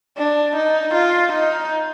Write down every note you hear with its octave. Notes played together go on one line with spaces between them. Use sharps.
D4
D#4
F4
D#4